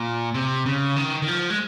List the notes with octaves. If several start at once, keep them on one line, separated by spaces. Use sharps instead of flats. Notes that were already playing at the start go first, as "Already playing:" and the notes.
Already playing: A#2
C3
C#3
D#3
D#3
F3
G#3